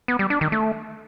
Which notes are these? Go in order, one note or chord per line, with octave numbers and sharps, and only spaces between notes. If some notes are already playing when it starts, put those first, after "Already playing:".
B3
G3
D4
D#3
A3